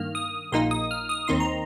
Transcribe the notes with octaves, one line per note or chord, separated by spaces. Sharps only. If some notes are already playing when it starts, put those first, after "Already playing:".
Already playing: G2 D#3 A#3 F6
D#6
A#1 A#2 A#3 D#4 C6
D#6
F6
D#6
D#2 D#3 C4 D#4 C6
A#5